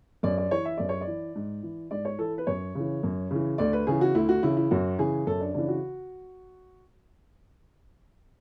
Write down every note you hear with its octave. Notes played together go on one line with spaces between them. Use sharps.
F#2 D5
D5
E3 C#5
E5
F#2 D5
C#5
D5
E3
G#2
E3
G#2 D5
C#5
E3 A4
B4
F#2 C#5
C#3 E3
F#2
C#3 E3
D2 D5
B4
C#3 E3 G#4
F#4
D2 E4
F#4
C#3 E3 E4
E4
F#2 F#4
C#3 E3 G#4
F#2 A4
D4
C#3 E3 D4
F#4